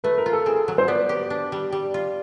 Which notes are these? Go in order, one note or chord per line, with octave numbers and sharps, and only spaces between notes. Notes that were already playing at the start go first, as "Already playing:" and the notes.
A3 B4
A#4
F4
A4
C4 G#4
F#3
C5
B3 D5
G4
D4
G3
G3
F4